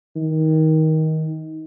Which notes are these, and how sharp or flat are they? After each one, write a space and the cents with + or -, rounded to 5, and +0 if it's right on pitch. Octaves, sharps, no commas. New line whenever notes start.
D#3 +20